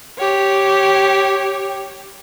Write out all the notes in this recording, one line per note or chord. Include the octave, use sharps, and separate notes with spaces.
G4 C#5